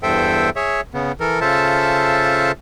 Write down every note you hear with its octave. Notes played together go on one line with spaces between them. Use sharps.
E2 G2 A4 C5 E5 G5
G#4 C#5 E5
C#3 B3
E3 A4 A#4
C#3 F4 A4 C5 E5 A5